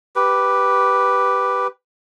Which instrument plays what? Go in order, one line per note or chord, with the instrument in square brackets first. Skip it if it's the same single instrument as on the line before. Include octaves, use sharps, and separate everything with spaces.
[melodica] G4 B4